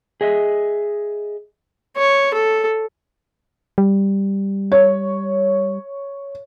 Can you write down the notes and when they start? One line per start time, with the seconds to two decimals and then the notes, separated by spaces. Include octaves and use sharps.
0.21 G#4 D#5 E5
1.97 C#5
2.34 A4
3.78 G3
4.72 C#5